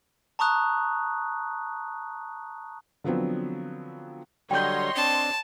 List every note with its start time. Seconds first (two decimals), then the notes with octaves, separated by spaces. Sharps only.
0.39 A5 A#5 C#6 D#6 F#6
3.04 D3 F3 F#3 B3 C4
4.51 D3 F#3 G3 C#5 D#5 G5 C6 G6
4.96 C4 D4 A5